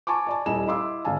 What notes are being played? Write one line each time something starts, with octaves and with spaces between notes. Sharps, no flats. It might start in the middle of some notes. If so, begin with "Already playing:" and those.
G#5 A5 C#6 D6
D5 G#5 A5
D#1 E4 D#5 G#5 E7
E4 D#5 F5 C6 D6 E6
G#1 D3 F5 G#5 A5